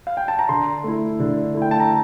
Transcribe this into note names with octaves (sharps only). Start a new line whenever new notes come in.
F5
G5
A5
A#5
D3 C6
A3 E4
D3
A3 E4
G5
A5
A#5